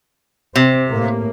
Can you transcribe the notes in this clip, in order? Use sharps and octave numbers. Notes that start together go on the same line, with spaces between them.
C3 C4
A2 A#3